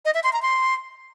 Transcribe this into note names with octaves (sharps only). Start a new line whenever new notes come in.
D#5
E5
C6
A#5
C6